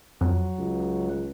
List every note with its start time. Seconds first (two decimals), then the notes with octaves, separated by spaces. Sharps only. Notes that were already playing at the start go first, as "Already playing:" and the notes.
0.21 F2 F#3
0.59 C#2